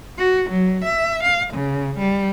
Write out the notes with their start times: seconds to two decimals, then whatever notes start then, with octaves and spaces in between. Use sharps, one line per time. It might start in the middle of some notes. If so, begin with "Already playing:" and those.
0.18 F#4
0.50 F#3
0.84 E5
1.23 F5
1.53 C#3
1.98 G3